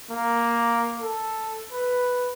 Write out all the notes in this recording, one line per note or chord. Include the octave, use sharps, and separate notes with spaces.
A#3
A4
B4